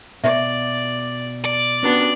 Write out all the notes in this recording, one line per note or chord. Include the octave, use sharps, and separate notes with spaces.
B2 D5 E5
D5
B3 C#4 D4 F#4 G4